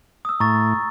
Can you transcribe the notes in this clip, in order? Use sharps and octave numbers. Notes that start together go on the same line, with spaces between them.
D#6 E6
A2 A#5 C#6 A6